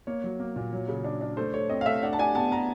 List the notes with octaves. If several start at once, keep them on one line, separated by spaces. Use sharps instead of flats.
A#3 C#5
F#3
A#3
A#2
F#3
C#3
D4
D4
A3 C5
A3 C#5
C4 D#5
F5
A3 E5
D4 F#5
A5
D4 G#5
B3 A5
B3 A#5